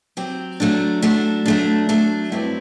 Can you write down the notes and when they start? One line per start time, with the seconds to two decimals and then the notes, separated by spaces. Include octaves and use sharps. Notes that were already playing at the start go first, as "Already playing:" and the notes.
0.17 F#3 C4 G4
0.60 F#3 A3 D4
1.02 F#3 A3 D4
1.46 F#3 A3 D4
1.89 F#3 A3 D4
2.32 G2 F#3 C4 E4